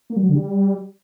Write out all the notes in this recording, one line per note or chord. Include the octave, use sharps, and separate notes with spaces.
A#3
G3
F#3
D3
G3